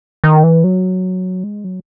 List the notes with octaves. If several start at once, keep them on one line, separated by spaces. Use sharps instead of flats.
D#3
E3
F#3
G#3
F#3